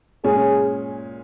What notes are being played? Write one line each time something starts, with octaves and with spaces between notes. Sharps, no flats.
A#2 G#3 C#4 G#4